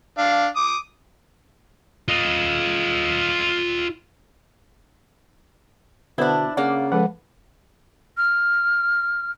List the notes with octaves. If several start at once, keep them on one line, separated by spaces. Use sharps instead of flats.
D4 F5
D6 D#6
F4 D#5
B2 D3 B3 D4 E4 C5
C#3 A#3 D5 F#5
F3 G#3 A4 B4 F#5
F6